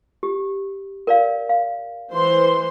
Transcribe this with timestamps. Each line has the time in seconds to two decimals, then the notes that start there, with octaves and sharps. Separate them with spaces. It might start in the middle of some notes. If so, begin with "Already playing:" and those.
0.23 G4
1.07 A#4 D5 F5
1.49 F5
2.11 E3 C5 C6